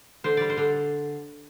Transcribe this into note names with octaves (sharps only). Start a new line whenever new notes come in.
D3 C5
G3 D5
C5
D3